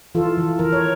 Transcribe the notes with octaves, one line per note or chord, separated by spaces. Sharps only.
E3 F4 A4
E3
E3 A#4
C#5